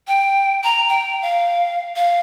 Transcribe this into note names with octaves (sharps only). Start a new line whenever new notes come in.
G5
A#5
G5
F5
F5